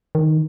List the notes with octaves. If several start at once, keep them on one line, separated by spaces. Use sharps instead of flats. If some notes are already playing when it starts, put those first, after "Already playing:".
D#3